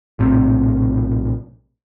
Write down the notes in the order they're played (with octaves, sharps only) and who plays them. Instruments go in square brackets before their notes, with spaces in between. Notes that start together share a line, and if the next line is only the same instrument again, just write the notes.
[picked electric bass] A#1 A2 C3